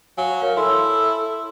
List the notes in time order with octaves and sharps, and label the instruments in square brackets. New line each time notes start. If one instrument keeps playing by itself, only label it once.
[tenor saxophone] F#3 [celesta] F5 G#5
[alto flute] A#4 [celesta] C#5 F5
[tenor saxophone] E4 [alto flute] A4 [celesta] C6